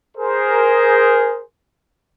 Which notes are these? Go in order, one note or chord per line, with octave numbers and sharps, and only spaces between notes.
G#4 A#4 C5